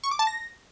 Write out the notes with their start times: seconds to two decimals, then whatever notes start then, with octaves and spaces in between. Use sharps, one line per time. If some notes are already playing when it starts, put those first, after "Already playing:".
0.04 C#6
0.11 D6
0.19 A5
0.27 A#6